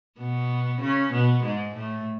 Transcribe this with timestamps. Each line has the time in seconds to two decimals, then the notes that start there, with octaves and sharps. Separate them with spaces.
0.19 B2 B3
0.81 C#3 C#4
1.12 B2 B3
1.43 G#2 G#3
1.74 A2 A3